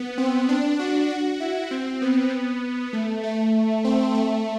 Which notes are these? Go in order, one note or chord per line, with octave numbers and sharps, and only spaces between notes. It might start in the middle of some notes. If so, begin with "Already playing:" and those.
Already playing: B3
C4
D4
F#4
F#4
E4
C4
B3
A3
A3
C4
A3